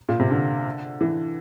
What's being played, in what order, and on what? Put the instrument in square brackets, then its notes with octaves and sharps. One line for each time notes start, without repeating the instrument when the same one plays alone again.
[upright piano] A#2
C3
D3
E3